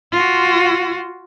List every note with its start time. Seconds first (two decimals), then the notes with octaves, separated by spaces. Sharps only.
0.12 F4 F#4